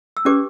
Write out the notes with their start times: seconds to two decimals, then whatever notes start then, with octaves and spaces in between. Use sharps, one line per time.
0.17 E6
0.25 C#4 G4 B4 D5 D6